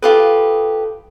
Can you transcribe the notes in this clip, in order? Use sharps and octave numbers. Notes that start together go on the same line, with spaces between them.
F4 G4 A4 B4